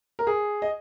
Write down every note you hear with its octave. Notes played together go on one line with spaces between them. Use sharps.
A#4
G#4
D#5